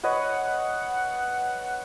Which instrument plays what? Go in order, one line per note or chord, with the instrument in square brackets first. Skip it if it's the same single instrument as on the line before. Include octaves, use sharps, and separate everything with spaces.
[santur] B4 C#5 D#5 [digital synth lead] F#5